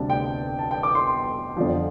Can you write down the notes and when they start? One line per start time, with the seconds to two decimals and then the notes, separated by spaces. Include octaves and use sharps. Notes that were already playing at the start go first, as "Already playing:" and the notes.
Already playing: D2 C3 G3 D4 A5
0.10 G5
0.59 A5
0.71 G5
0.83 D6
0.95 C6
1.56 F2 D3 F3